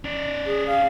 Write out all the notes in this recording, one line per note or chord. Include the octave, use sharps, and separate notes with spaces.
C#4 D5
G#4
F5